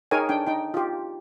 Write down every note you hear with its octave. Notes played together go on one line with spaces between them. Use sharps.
D#4 G#4 A#4 C#5 G5 G#5
D4 G5
D#4 G5
F4 G4